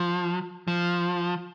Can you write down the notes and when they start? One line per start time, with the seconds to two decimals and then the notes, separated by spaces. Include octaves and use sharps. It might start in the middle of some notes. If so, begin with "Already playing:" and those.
Already playing: F3
0.68 F3